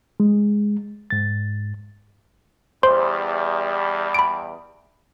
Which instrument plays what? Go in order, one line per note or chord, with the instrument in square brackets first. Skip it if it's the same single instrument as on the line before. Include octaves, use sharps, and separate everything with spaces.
[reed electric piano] G#3
G#2 A6
[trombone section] E2 G3 [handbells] C5 C6
[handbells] B5 D7